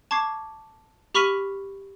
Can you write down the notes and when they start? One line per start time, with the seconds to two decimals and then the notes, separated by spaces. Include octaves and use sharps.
0.11 A5 C#6 D6 G#6 C7
1.15 G4 B5 C#6 F6 B6 D#7